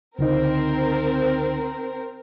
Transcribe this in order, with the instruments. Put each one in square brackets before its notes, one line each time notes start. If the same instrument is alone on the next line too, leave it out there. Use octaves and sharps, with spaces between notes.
[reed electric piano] C#2 D3 D#4 [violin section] C4 A#4